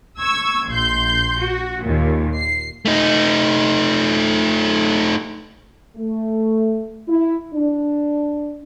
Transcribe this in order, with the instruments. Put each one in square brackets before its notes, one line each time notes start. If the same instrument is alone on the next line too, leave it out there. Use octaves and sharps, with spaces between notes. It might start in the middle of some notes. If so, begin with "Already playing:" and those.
[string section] C#6 E6 G#6
A#1 C6 G6
F#4
D#2 A#2
C7
[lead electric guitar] A3 D#4
[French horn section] A3
E4
D4